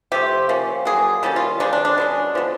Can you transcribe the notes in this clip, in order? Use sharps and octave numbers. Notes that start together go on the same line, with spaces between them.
C3 F3 A3 C4 G4
F3 A#3 C#4
D3 F#3 A#3 G#4
D#3 G3 A#3 C#4 A4
F4
D#3 G#3 C4 D4
D4
D4
B2 G#3 C#4
D3 F3 G#3 B3